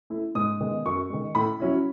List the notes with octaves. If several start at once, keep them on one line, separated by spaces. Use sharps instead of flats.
A3 E4
G#2 D#6
D#3 G#3 B3
F#2 C#6
D#3 G#3
A2 B5
F#3 C#4 E4